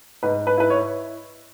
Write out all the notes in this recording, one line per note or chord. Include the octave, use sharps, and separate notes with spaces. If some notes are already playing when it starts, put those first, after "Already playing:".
G#2 B4
B4
E4 B4
C#5